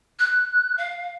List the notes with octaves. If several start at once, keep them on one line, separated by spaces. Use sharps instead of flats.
F#6
F5